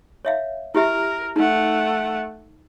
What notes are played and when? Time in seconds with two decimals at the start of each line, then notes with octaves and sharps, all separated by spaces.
0.25 C#5 E5 F5
0.75 E4 G4 A#4 E5
1.36 A3 D#4 F#5